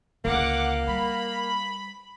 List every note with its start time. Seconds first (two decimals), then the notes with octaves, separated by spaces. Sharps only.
0.25 C#2 D3 A#3 F#5 D6
0.87 G3 B5